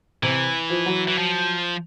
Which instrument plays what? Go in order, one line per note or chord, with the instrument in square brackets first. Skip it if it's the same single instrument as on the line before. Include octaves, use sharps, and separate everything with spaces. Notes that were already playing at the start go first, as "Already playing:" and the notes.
[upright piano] C3 [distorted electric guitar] E3
[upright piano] F3
F#3
[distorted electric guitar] E3
F3